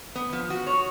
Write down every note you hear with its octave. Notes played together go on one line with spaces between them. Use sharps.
B3
F3
F#4
C#5